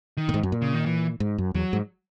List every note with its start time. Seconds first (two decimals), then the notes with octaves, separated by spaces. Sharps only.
0.17 D#3
0.29 A#2
0.34 G#2
0.43 F#2
0.52 A#2
0.62 C#3
0.74 D#3
0.86 E3
1.20 G#2
1.38 F#2
1.54 E2 F#3
1.73 G#2